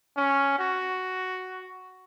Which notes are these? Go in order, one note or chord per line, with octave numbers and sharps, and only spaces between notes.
C#4
F#4